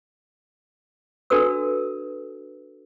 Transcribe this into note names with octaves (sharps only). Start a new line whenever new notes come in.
D4 F#4 A4 B4 E6